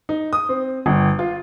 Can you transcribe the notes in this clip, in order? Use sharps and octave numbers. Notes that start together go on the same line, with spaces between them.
D#4
D#6
C4
G1
F4